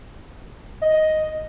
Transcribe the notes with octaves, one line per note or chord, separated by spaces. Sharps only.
D#5